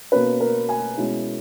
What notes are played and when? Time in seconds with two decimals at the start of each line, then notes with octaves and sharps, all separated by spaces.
0.12 B2 A#3 C#4 B4
0.40 A#4
0.69 G#5
0.97 B2 G#3 C#4 E4